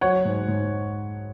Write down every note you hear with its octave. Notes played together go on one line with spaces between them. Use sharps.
F#3 C#5 F#5
G#2
G#2